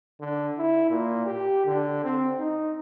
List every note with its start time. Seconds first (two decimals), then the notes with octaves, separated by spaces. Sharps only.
0.20 D3
0.58 E4
0.90 A#2
1.27 G4
1.66 D3
2.04 C4
2.38 D#4